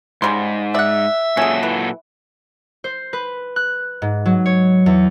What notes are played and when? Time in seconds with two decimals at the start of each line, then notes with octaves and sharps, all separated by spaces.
0.22 G#2 C#3 G3 C6
0.75 D5 E5 F#5
1.37 A#2 F#3 C#4 G#4 A4
1.63 E3
2.84 C5
3.13 B4
3.56 F#6
4.02 G#2
4.26 F#3
4.46 C#5
4.86 E2